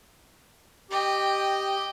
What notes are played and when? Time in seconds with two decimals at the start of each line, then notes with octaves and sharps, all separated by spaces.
0.91 G4 D#5 G5